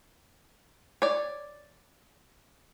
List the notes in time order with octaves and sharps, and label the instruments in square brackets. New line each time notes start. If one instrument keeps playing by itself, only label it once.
[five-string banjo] C#5 D5